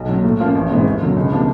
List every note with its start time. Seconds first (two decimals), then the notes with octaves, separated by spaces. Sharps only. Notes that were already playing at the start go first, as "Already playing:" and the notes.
Already playing: B1
0.09 A#2 F#3
0.24 A2
0.40 F3 A#3 C#4 F4
0.55 A1
0.71 G#2 E3 G#3 C4
0.86 D#2
1.01 D3 F#3
1.16 C#2
1.32 C3 F3 A#3 D4